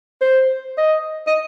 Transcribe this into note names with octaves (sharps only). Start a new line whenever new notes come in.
C5
D#5
D#5